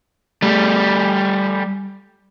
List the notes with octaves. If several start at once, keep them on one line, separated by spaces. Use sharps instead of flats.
G3 A3